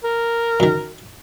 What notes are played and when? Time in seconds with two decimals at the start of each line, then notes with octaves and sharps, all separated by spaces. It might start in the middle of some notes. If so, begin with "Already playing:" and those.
0.04 A#4
0.60 F#2 D#3